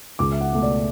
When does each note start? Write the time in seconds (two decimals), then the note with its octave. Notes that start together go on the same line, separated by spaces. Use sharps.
0.19 C#2 D6
0.32 E5
0.41 F#5
0.52 B2 A3
0.63 D5